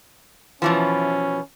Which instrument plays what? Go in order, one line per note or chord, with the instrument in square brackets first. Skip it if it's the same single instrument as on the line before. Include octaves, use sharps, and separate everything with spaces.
[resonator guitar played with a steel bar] B2 E3 F3 [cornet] C#4